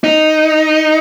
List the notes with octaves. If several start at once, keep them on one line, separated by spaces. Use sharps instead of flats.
D#4